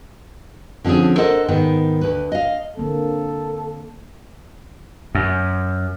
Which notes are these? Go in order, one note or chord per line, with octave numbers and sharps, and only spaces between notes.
D3 F3 C4 C#4 G#4
A4 A#4 C5 D#5 F#5
G#2 D#3 B3
D2 B4
D#5 F5
D3 A#3 C4 A4
F#2